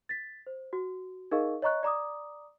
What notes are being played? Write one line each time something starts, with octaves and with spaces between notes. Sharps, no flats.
A6 B6
C5
F#4
D#4 G#4 A#4 D#5 F5 C#6
C#5 D#5 A#5 C#6 F#6
D5 A#5 D6 D#6